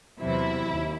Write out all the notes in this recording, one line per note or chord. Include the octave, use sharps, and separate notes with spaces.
E2 C3 F#3 E4
D#2